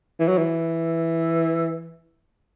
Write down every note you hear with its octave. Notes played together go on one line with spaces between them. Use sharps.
E3
F#3
E3